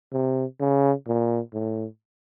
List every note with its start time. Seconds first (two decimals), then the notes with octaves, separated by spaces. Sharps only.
0.13 C3
0.60 C#3
1.07 A#2
1.53 A2